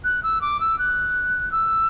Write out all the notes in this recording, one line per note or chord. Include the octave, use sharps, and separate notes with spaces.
F#6
E6
D6
E6
F#6
E6